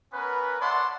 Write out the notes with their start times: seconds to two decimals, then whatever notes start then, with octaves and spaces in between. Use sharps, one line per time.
0.13 B3 C#4 A#4 B4
0.59 C#5 D5 E5 F#5 A5 C6